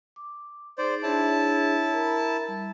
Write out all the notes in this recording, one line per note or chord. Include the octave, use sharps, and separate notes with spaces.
D6
D#4 G#4 C5 D5
D4 E4 G#4 C#5 A5
A#4 A#5 B5
G3